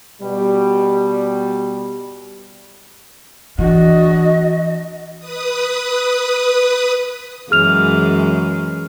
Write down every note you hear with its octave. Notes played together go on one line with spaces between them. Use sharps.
B2 G3
E3 D4 F#4 D#5
B4 D#6
F#2 E3 G#3 G#4 F6 F7